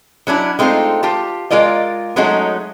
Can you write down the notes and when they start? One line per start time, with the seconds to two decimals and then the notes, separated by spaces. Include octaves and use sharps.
0.27 F#3 C#4 D4 E4
0.59 G#3 A3 C4 D#4 F4
1.03 F4 G4 A5
1.50 G#3 F4 A#4 D5 D#5
2.16 F#3 G#3 A3 C#4 D#4 F#4